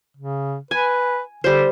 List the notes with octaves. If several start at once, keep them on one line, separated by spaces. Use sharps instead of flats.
C#3
B4 G#5
D3 G3 C5